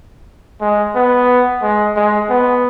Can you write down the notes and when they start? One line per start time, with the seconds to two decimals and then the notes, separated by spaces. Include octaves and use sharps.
0.61 G#3
0.95 B3
1.63 G#3
1.96 G#3
2.30 B3